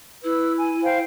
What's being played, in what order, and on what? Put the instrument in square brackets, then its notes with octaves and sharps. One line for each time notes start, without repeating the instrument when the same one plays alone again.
[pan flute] E4 [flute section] B4 E6
[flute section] G#5
C5 F5 G5